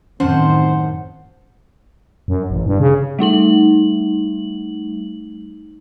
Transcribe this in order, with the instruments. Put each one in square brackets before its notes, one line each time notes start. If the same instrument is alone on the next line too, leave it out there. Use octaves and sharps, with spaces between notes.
[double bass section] A1 D#3 [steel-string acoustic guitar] F#2 F#5 A5 [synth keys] C4 C#4 [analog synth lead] C5
[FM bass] F#2
A1
G2
C#3
[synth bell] G3 A3 D#4 F#7